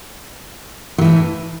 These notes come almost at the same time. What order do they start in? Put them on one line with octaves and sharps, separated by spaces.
F#3 E3 A2